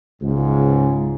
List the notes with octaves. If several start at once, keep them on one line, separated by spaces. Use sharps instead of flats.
C#2 G#2